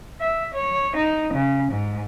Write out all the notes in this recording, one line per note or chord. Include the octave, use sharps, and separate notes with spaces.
E5
C#5
D#4
C#3
G#2